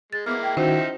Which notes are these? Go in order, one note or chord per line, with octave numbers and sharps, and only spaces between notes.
G#3 A6
G#3 A#3 B3 E4 D6 F6
G5
D#3 F3 C#4 D#4 E4 F#4 C5 E5